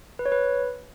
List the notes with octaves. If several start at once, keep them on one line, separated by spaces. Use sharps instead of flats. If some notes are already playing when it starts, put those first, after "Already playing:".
B4
C#5
B4